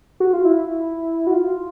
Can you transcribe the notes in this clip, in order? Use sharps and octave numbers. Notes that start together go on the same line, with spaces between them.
F#4
F4
E4
F#4
F4